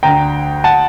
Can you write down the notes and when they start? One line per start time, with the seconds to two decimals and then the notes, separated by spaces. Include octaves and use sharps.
0.03 D2 D3 G5 A#5
0.64 F#5 A5